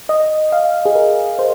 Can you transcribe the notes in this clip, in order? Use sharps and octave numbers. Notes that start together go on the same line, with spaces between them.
D#5
F5
G#4
A#4
C5